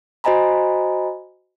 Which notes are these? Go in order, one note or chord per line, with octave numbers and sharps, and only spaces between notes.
F#4 C5 D#5 G#5 A#5 B5